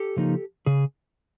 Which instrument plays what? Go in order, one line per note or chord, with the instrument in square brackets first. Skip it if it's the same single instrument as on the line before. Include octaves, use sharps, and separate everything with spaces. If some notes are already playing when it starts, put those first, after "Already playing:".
Already playing: [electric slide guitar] G4 A4
C#3 F3 A#3 D#4
C#3 G#4